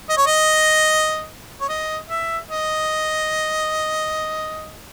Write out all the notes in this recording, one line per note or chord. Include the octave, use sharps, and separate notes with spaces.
D#5
C#5
D#5
C#5
D#5
E5
D#5